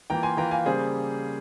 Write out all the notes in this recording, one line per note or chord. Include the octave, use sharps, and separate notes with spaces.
E3 A#3 F4 G5 A#5
G#5 C6
E3 A#3 F4 G5 A#5
F5 G#5
C#3 G3 A#3 G#4 C5